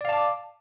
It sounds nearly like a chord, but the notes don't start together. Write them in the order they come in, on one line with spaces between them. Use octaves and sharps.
D5 F5 A5 D6